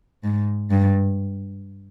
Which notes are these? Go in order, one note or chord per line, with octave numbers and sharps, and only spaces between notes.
G#2
G2